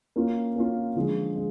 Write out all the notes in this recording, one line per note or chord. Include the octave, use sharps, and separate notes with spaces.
A#3 C#4 F4
A#3 C#4 F4
D3 F3 G#3
G#3